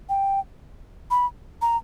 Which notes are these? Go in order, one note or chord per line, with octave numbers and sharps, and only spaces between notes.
G5
B5
A#5